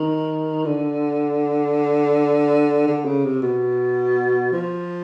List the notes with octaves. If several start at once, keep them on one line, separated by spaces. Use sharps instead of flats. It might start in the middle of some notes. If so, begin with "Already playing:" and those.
Already playing: D#3
D3
D3
C#3
C3
B2
F3